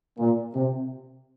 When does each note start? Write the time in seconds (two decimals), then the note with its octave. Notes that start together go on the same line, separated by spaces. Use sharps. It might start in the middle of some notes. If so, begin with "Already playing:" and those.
0.19 A#2
0.55 C3